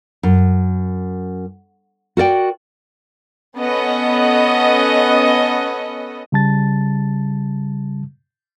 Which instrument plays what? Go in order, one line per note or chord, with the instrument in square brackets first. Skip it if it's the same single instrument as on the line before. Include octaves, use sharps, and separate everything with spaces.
[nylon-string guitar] F#2
F#4 A#4 D5 G5
[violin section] B3 C#4 A4 D#5 F#5
[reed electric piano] C#3 G3 A5 A6